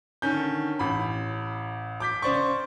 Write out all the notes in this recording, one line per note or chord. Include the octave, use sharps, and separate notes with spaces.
D3 D#3 C#4 G6
A1 B5
D6 G6 B6
C#3 C5 D5 C#6